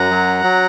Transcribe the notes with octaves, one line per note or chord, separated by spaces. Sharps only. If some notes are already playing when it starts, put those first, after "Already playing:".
Already playing: F#2 F#5 A#5
F#3
F#3